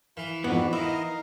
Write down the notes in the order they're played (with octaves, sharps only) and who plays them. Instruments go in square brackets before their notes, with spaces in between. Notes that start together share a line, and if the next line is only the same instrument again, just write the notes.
[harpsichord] E3 [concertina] E4 F5
[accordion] F2 G#2 [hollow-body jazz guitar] B3 [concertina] F#4 B4 D5
[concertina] D#4 A#4 F5 [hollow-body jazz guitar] E4 [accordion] D#5